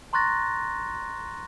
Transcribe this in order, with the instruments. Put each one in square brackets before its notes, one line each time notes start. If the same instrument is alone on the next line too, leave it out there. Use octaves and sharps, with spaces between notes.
[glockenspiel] A#5 C6 C#6 F#6 A6 A#6